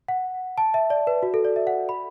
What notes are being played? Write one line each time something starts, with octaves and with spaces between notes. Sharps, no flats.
F#5
A5
E5
D5
B4
F#4
A4
D5
E5
F#5
B5